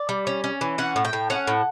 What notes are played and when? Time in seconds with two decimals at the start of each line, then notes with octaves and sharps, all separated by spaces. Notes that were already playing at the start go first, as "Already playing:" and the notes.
Already playing: D5
0.09 G3
0.27 C#4
0.44 C#4
0.61 E3
0.78 C#4 F#5
0.96 A2
1.05 G5
1.13 A2
1.30 C#4 F#5
1.47 A2